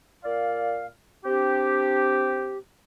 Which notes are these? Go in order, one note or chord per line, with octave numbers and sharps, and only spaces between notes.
A#2 D5 F5
C4 D4 G4